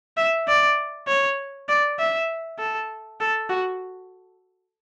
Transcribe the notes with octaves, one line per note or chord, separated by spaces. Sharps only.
E5
D5
C#5
D5
E5
A4
A4
F#4